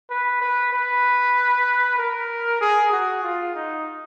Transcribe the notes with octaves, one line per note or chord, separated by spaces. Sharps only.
B4
B4
B4
A#4
G#4
F#4
F4
D#4